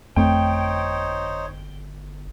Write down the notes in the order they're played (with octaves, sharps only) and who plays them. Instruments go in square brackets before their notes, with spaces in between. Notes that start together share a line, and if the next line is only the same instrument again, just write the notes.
[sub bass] G1 [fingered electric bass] F2 A3 C4 [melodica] D#4 C5 C#5 [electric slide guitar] G5